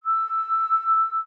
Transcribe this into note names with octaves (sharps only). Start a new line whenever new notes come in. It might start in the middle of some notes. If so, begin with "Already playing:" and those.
E6